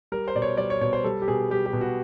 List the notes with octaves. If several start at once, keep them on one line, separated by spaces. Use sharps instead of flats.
G3 A#4
C5
B2 D5
C#5
G3 D5
C#5
B2 C#5
C5
G3 A4
G4
B2 G#4
G3 G4
G4
B2
F#4